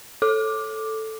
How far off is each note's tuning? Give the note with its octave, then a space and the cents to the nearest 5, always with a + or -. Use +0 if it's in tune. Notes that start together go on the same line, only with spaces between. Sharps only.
A4 +0 D6 +5